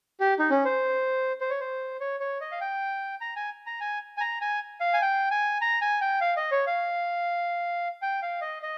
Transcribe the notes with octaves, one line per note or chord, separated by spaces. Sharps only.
G4
D#4
C#4
C5
C5
C#5
C5
C#5
C#5
D#5
F5
G5
A#5
G#5
A#5
G#5
G#5
A#5
G#5
F5
G#5
G5
G#5
A#5
G#5
G5
F5
D#5
C#5
F5
G5
F5
D#5
D#5